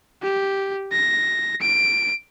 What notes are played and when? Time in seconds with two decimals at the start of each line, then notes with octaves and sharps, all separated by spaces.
0.23 G4
0.93 A#6
1.62 D7